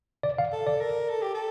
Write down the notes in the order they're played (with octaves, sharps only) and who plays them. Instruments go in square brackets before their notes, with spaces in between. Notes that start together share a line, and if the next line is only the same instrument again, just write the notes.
[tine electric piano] D5
F5
[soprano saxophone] A4
[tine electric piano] D5
[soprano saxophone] A#4
A4
G4
A4